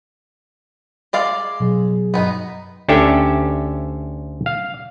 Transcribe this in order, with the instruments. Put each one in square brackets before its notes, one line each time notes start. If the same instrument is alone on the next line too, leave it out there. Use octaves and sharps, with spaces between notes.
[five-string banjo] G#3 D5 F5
[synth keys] B2 F#3 G#4
[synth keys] G2 F#3 [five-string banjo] B3 D#4
[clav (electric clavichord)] D2 C#4 D4 G4 A4 E5
F5